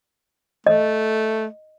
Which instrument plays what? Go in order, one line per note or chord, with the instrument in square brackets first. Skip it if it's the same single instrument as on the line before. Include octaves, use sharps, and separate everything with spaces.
[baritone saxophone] A3 [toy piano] D#5